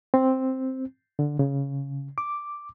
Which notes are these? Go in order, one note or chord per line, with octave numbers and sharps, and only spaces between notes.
C4
D3
C#3
D6